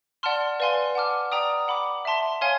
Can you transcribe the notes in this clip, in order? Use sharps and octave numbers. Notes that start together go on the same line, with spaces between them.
D5 F#5 A5 C6 F6
B4 D5 F5 G#5 C6
F#5 A5 D6 F6
D5 G5 A#5 D#6
F#5 B5 D6
E5 A5 C6
C#5 F5 G#5 C6 F6